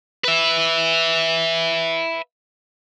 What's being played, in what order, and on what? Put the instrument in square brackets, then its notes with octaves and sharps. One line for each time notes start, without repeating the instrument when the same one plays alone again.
[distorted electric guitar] B4 E5